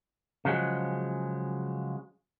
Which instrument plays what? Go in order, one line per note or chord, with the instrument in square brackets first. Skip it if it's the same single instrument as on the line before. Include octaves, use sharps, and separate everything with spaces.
[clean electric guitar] C#3 F3 F#3 G#3